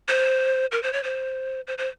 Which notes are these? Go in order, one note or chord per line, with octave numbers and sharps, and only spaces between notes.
C5
A#4
C5
C#5
C5
C5
C5